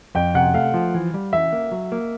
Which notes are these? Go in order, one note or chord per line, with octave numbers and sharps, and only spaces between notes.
F2 G5
C3 F#5
A3 F5
F3
E3
G3
E3 E5
A#3
F#3
A#3